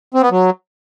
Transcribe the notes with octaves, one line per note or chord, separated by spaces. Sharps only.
C4
B3
F#3